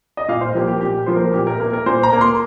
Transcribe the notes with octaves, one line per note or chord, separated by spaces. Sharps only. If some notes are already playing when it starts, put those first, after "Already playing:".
D#5
A#2 F5
C5
F3 A#3 G4
G4
A#2 G4
F3 A#3 C5
A#4
A#2 G4
A#4
A#3 A#4
A#4
A#2 C5
A#5
A#3
C6